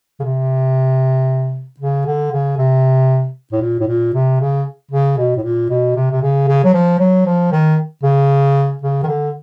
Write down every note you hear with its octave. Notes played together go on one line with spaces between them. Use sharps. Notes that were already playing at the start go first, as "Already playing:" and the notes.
C#3
C3
C#3
D3
C#3
C3
A2
A#2
A2
A#2
C3
C#3
C#3
B2
A2
A#2
B2
C3
C3
C#3
C#3
F#3
F3
F#3
F3
D#3
C#3
C#3
D#3
D3